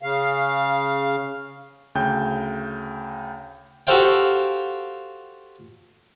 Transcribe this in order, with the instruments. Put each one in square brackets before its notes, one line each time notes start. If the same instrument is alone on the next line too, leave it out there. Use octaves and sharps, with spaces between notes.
[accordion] C#3 F5
[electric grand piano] D2 C#3 G5 G6
[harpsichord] F#4 G4 A4 C5 F5 G5